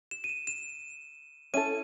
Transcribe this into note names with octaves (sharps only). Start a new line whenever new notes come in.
E7
D#7
E7
E7
C#4 E4 A4 D#7